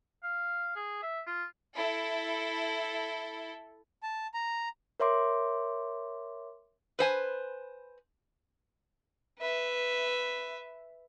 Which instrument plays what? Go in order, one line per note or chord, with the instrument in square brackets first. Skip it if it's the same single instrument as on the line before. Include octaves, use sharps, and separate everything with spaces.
[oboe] F5
G#4
E5
F4
[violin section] E4 A4
[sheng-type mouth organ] A5
A#5
[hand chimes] A#4 C#5 E5 C6 D6
[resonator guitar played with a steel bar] B4 C5 G#5
[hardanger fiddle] B4 E5